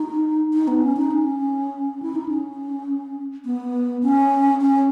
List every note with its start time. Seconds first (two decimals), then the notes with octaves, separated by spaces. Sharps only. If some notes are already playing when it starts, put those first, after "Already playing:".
Already playing: D#4
0.54 D#4
0.68 B3
0.82 C#4
0.97 D#4
1.11 C#4
2.02 E4
2.15 D#4
2.28 C#4
3.45 B3
4.03 C#4
4.61 C#4